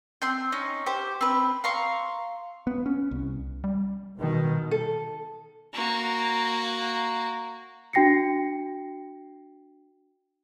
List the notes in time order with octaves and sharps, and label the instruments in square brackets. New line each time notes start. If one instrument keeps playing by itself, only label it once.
[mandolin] C4 C6 G6
C#4 D#4
G4 C5
C4 B4
F5 A#5 C6 C#6
[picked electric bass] B3
C#4
C2
[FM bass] G3
[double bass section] B2 D#3
[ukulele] A4
[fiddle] A#3 F#4
[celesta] D4 F#4 G5 A#6 C7 C#7